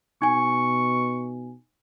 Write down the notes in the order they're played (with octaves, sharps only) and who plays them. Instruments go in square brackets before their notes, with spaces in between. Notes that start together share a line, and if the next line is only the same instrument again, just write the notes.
[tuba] B2 [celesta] D#4 G#5 [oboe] C#6